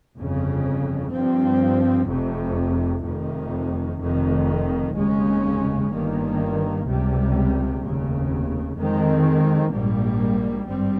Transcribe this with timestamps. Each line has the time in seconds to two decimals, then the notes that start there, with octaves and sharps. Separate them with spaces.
0.16 G1 F2 C#3
1.12 G2 F3 C4
2.08 F1 F2 C3
3.03 F1 F2 C3 D#3
3.99 F1 F2 D#3
4.94 F1 D#2 C#3 G#3 C#4
5.91 G1 G2 D#3 A#3
6.86 C#2 C3 G3
7.82 F1 D#2 C#3
8.77 F2 D#3 G#3 C4
9.73 A#1 G#2 G3 A#3
10.69 G#1 G2 G3 C4